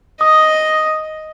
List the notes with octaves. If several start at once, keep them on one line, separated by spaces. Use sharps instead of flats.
D#5 D#6